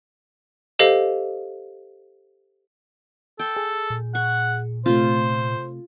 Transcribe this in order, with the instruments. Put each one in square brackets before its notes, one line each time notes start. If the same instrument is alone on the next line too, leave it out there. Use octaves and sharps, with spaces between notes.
[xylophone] G4 A4 C5 D#5 F5
[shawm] A4 [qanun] G5
[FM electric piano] G#4
[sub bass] A#2
[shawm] F#5 [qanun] C#6
[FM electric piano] C3 A3 [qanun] F4 [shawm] C5